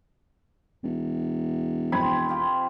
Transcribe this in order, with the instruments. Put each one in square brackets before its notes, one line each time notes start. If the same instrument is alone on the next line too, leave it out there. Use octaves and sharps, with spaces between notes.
[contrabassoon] E1
[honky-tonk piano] F2 B5 G#6 [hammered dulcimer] C4
[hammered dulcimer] F4 G4